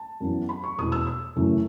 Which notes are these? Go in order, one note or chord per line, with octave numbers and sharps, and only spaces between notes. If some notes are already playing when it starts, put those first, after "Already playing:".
Already playing: A5
F#2 E3 B3
B5
C#6
E1 E2 B2 D#6
E6
E6
F#1 F#2 E3 A3